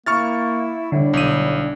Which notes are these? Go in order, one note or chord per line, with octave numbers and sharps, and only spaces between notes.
A#3 E4 C#6 F6 A6
A2 D3 G3
B1 D#7